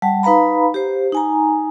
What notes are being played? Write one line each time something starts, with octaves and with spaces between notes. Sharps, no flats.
G3 F#5 A5
D#4 B4 F5 A#5 B5
G4 C5
D#4 G#5 A#5